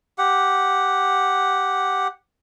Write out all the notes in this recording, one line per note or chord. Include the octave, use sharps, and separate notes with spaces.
G4 F#5